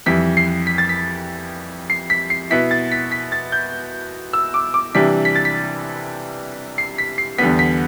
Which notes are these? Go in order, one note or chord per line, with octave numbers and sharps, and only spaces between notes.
F2 E3 G3 B6
C7
B6
A6
B6
C7
B6
C7
B2 B3 E4 B6
A6
B6
B6
A6
G6
E6
D6
D6
C3 E3 G3 D4 B6
B6
A6
B6
C7
B6
C7
E2 D3 G3 B3 B6
B6